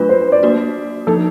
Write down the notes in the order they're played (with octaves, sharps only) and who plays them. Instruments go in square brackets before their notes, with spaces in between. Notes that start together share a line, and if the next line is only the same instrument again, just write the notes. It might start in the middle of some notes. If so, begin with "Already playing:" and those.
Already playing: [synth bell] F#3 A3 D4 F4 [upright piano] B4
[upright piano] C5
D5
[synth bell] A#3 D4 F#4
[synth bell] F3 A#3 D#4 [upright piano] A4